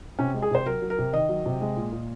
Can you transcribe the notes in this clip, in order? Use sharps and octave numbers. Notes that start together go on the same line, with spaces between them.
C3 C#4
G#3
G#4
C3 C5
F#3 A#4
F#3
A#4
C3
D#3 D#5
F#3
C3
G#3
A#2
A#2